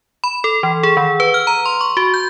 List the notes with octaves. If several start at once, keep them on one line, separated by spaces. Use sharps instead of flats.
B5
A4
E3
G#4
D#3
B4
F6
A#5
C6
C#6
F#4
G6